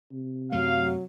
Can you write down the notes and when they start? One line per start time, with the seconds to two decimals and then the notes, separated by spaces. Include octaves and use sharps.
0.12 C3
0.52 F#2 F#3 A3 F5